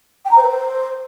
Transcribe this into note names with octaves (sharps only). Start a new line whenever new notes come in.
G5
A#5
C5
B4
C5